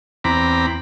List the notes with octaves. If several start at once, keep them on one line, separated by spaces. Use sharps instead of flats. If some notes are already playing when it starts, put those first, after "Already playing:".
E2 C4 A#5 B5 D6